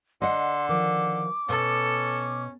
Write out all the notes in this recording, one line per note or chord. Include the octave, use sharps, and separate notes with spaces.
D3 D#5 F#5 C6
D#3 F3 D6
B2 C#4 A4